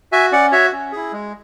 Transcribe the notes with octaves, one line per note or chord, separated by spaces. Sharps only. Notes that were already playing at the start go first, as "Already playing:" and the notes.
F#4 E5 G#5
C#4 D5 F#5
F#4 C#5 E5
C#4
E4 G#4
G#3